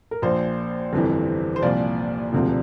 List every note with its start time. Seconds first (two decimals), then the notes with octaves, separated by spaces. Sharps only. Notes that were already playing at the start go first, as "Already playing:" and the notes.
0.11 A#4
0.22 A#1 A#2 F3 C5
0.93 G1 F2 C3 E3
1.56 C5
1.62 C2 A#2 F3 D5
2.33 E1 D2 C3 F3